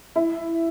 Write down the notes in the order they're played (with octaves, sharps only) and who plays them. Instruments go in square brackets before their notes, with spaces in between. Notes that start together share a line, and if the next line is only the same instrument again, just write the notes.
[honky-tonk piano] E4